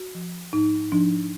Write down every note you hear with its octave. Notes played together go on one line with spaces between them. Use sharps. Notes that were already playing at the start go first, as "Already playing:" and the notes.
Already playing: F#4
F3
G#2 D#4
F3 D4